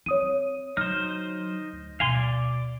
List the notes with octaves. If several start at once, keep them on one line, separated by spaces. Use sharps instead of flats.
C4 C#5 D#6 D#7
D3 F#3 D#4 C5 F6
D2
B2 F5 G#5 C6
D5